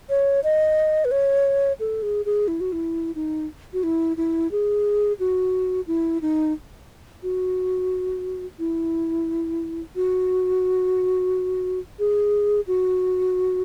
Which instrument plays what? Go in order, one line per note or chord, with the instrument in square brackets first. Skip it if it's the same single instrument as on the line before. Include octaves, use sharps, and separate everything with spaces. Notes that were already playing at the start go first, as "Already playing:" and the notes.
[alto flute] C#5
D#5
B4
C#5
A4
G#4
G#4
E4
F#4
E4
D#4
F#4
E4
E4
G#4
F#4
E4
D#4
F#4
E4
F#4
G#4
F#4